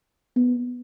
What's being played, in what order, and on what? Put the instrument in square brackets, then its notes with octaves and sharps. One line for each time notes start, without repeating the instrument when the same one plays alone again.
[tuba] B3